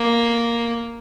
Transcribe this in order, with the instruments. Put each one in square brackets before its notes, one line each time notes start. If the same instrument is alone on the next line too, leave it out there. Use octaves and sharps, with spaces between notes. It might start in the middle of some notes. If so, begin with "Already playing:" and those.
Already playing: [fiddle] A#3